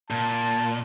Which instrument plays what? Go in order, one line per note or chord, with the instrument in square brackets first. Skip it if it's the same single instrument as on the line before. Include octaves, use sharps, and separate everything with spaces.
[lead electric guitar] A#2 [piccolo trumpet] A5